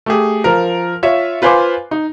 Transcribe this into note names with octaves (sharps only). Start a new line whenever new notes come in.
A3 G4 G#4
F3 A#4
F4 C#5 E5
F4 B4 C5 G#5 C6 D6
D#4